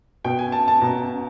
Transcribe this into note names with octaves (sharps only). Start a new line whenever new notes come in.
B2 G5
G#5
A5
A5
B2 A#5